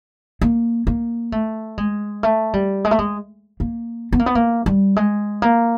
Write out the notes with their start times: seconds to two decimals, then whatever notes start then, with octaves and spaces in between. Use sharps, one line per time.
0.41 A#3
0.87 A#3
1.32 A3
1.78 G#3
2.23 A3
2.53 G3
2.85 G#3
2.91 A3
2.99 G#3
3.60 A#3
4.13 B3
4.19 A#3
4.26 B3
4.35 A#3
4.66 G3
4.96 G#3
5.42 A#3